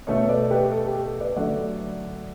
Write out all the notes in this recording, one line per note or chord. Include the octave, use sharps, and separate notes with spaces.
B2 A3 A4 C#5
B4 D5
G4 B4
A4
G4
B4 D5
D3 F#3 A3 D5 F#5